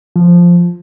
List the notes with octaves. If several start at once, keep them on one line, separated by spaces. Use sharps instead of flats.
F3